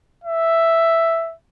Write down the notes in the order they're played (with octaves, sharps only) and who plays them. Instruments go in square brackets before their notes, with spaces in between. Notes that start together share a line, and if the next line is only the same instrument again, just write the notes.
[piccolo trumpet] E5